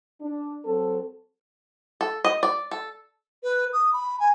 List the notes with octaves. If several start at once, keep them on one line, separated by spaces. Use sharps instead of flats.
D4
F#3 C4 A4
A4
D#5
D5
A4
B4
D#6
B5
G#5